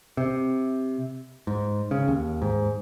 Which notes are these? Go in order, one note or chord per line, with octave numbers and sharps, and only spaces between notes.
C3
G#2
C#3
D#2
G#2